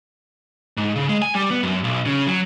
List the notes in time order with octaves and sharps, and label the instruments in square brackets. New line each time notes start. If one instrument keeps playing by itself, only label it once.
[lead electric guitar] G#2
C#3
G#3
G#5
G3
B3
F#2
B1
C#3
F#3